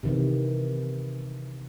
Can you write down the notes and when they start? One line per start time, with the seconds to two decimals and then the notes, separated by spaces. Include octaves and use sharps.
0.03 C3 D#3 E3